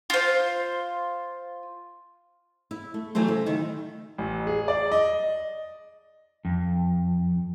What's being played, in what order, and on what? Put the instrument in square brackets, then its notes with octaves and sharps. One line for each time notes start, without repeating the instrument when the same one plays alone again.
[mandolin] F4 C5
[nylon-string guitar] E4
A3
E3 F#3 G3 A3 C5
C#3
D#3 E4
[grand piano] A1
G#4
D5
D#5
[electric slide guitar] F2